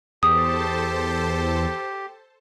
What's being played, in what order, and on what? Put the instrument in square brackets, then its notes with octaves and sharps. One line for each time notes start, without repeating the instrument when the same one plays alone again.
[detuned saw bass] E2 [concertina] G4 [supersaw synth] A4 C5 A5 [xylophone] D#6